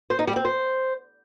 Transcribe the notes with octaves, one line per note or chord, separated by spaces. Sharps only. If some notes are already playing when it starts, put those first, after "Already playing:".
C5
D#4
G3
C4
C5